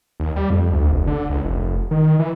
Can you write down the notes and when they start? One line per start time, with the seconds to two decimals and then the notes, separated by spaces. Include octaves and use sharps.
0.20 D#2
0.36 G3
0.50 F2
0.72 D2
0.92 F1
1.07 D3
1.30 C#2
1.45 F1
1.91 D#3
2.19 E3